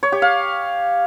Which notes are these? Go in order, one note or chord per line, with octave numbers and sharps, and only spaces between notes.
C#5
G4
F5